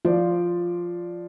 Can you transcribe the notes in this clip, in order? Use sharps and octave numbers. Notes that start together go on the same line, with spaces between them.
F3 F4 C5 D5